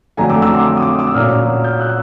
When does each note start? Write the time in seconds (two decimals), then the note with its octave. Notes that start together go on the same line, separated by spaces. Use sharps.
0.17 F2 D3 F#3 A3 G#5 A#5
0.30 D6 E6
0.42 D6 E6
0.54 C6 D6
0.77 D#6
0.82 D6 E6
0.99 D6 E6
1.15 A#2 F#3 A#3 C#4 D#6 F6
1.64 F6 G6
1.80 E6 F#6